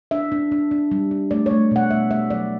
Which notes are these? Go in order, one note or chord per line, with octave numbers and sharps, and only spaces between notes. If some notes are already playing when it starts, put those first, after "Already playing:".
D4 E5
D4
D4
D4
G3
D4
A3 D5
A3 C#5
B2 F#5
A3 E5
A3 E5
F#3 D5